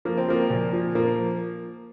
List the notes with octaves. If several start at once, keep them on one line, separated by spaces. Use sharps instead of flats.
F3 A#3
C4
F3 A#3
A#2
F3
F3 A#3